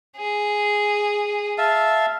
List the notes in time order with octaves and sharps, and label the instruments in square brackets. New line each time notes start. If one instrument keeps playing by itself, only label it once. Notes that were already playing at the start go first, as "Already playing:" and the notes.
[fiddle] G#4
[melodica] E5 F5 A5